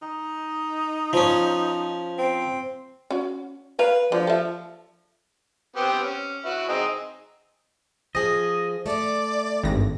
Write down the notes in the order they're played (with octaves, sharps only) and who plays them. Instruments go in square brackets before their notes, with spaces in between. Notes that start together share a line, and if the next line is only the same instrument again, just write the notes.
[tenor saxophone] D#4
[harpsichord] F3 C#4
[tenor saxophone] C4
[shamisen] C#4 F#4
[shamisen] A#4 F5 [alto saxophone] B4
[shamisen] D3 [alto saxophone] F3
[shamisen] A4 E5
[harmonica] B3 C4 G4
C#4
E4 F#4 B4
C4 D#4 G#4
[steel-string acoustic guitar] F3 G#4 [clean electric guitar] D#5
[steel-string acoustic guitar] A3 [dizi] D5
[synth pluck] G#1 G2 A#6